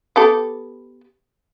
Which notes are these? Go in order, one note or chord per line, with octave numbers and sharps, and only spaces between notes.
B3 G4 A4